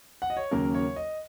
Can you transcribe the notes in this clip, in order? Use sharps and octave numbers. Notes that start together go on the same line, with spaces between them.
F#5
D#5
C#5
D#2 C#3 F#3 A#3 C#4 A#4
C#5
D#5